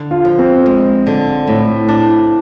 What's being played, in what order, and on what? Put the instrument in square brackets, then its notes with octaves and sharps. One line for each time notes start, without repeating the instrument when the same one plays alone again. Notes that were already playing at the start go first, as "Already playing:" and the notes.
Already playing: [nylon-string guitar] D3
[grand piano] F4
[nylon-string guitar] F3
[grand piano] C4
[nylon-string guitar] G#3
D3
A2
D4